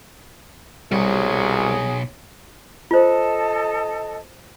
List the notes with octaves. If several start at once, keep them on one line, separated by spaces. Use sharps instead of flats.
C2 B2 F#3 G3 G#4 C#5
F4 A4 C5 D#5 A5